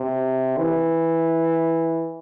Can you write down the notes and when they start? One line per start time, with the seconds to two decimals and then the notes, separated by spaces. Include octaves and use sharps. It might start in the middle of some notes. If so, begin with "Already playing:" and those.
Already playing: C3
0.58 E3